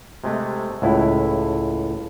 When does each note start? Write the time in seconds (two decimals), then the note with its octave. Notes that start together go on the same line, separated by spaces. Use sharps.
0.24 C3 G#3 A3
0.82 C#2 A2 E4